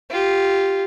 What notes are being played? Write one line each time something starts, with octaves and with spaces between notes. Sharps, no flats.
F4 G4